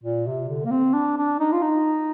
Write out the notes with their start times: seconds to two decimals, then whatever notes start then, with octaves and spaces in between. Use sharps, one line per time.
0.04 A#2
0.27 C3
0.49 D3
0.65 A#3
0.71 C4
0.94 D4
1.17 D4
1.40 D#4
1.52 F4
1.62 D#4